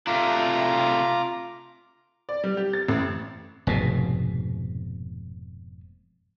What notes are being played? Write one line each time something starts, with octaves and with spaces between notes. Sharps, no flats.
C3 A3 D4 F4 A#5 D6
D5
G3
G4
A6
A1
F1 G#2 B2